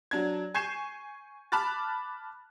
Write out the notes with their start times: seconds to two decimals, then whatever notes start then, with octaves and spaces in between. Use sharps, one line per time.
0.11 F#3 D4 G#6
0.54 G#5 C#6 G6 G#6 C7 E7
1.52 A5 B5 D6 F6 F#6 A6